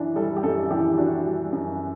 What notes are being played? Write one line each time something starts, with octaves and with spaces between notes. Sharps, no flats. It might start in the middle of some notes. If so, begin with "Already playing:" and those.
Already playing: F#2 E3 D4
G3 A4
G4
F#2 A4
E3 G4
D4 F#4
G3
F#2